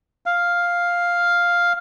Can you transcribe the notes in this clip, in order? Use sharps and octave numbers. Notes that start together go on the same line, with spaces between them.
F5